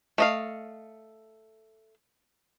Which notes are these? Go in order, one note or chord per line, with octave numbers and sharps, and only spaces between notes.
A3 D#5 F5